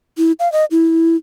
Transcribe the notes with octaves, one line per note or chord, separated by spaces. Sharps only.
E4
F5
D#5
E4